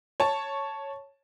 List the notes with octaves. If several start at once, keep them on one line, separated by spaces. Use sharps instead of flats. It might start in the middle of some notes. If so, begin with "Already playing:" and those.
C#5 A5